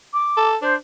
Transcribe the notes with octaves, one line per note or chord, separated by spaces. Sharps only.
D6
A4
D4 C5